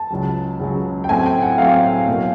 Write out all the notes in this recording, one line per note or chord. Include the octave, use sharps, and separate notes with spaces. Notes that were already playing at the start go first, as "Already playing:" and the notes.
Already playing: A5
C#2 C#3 F#3
C#2 C#3 F#3
G5
A2 F#3 A3 C4 G#5
G5
F#5
A2 F#3 A3 C4 F5
B2 F#3 A#3